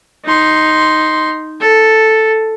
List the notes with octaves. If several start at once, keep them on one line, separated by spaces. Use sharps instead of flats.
D#4 C6
A4